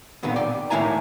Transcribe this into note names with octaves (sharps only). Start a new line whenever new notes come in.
A#2 D3 D#3 B3 C4
D5 G5
A2 D#3 A#3 E4 G#5 A#5